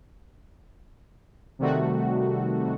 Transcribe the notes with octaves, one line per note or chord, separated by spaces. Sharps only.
C3 D#3 G3 A3 F#4